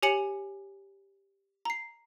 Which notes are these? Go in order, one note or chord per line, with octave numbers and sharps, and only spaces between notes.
G4 C#5 G#5 C#7 F#7
A#5 C7